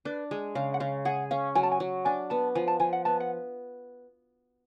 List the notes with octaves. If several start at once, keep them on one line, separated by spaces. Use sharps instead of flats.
D4 B4
G#3
C#3 F5
F#5
C#3 F5
G#4 F#5
C#4 F5
F#3 G#5
A5
G#5
F#3
D4 G#5
B3 A5
F3 G#5
A5
F3 G#5
F#5
B3 A5
F#5